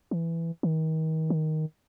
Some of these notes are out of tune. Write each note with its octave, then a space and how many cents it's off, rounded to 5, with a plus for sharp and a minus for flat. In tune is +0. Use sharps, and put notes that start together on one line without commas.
E3 +10
D#3 +35
D#3 +5